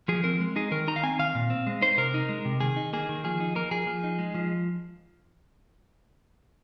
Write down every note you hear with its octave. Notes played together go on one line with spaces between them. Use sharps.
F3 G#4
C4 A#4
G#3
D#4 G#4
D#3 A#4
D#4 A#5
F5
C4 G#5
D#3 F5
A#2
C4
G#3
D#4 C5
C3 A#4
D#4
G#3
C3
D#3 G#4
D#4
A#3 G#4
D#3
F3 G#4
D#4
A#3 A#4
F3 G#4
F3
D#4
G#3
F3